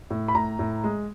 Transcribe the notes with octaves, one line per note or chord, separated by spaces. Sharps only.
A2
B5
A2 A#5
A2
G#3